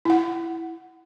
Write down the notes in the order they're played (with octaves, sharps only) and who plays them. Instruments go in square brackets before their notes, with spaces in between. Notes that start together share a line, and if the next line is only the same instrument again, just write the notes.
[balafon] E4 F#5